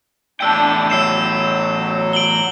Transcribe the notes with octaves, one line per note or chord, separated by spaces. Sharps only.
E2 A2 D4 G5 E6 G6
F#3 E6 C7 E7
D7 F#7 G7